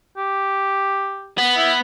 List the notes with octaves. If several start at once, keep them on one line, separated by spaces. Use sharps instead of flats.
G4
B3
E4